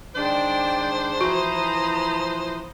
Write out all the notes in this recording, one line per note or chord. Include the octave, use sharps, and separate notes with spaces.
D#3 G#3 D4 C5 D5 G5
E3 F3 F#4 A#5 B5 D#6